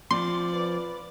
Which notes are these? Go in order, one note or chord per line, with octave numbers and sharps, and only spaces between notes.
F3 C4 D5 C6
B4